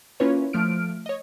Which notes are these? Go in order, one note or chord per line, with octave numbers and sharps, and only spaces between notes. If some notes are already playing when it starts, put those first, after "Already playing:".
A#3 C#4 E4 F4 B4 C#5
F3 A3 F6 D7
C#5 D#5